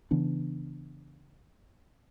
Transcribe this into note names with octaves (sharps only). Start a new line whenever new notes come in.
C#3 E3 B3 D4